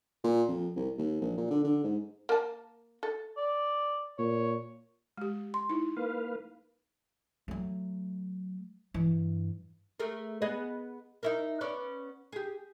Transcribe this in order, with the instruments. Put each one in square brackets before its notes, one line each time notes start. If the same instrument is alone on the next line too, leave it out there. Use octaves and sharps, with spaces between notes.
[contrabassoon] A#2
F2
C2
D#2
A#1
A#2
D3
D3
G#2
[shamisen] A#3 A5
A4
[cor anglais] D5
[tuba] A#2 [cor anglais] C#5
[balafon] G#3 G4
[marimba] C6
[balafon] D#4 E4
[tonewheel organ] A#3 B4 F5
[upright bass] F#3 A3
G2 E3
[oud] A3 G#4 A#4
B3 G#4 D#5
D#4 E4 A#4
B3 C#4 D5
G4 G#4